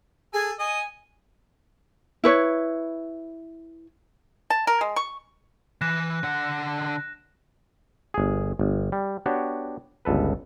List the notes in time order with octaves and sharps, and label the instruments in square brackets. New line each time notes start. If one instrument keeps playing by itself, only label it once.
[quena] G#4 [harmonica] A4 G#5
[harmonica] D#5 [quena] G#5
[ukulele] E4 B4 C#5
[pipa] A5
A#4
G#3
C#6
[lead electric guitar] E3 [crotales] F#6 A#6 E7
[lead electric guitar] D3 F#5
[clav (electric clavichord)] G1 G#4
G1
G3
B3 D4 F#4 G4 C#5
G1 C#2 A4 B4